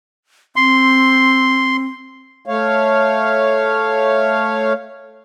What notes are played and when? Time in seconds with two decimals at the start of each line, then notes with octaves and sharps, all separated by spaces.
0.56 C4 C6
2.46 A3 C#5 F5